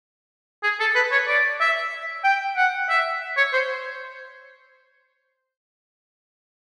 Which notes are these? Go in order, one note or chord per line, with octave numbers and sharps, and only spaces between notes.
G#4
A4
B4
C#5
D5
E5
G5
F#5
E5
C#5
C5